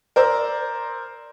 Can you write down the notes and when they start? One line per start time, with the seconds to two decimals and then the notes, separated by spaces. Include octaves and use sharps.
0.16 A#4 C5 D5 E6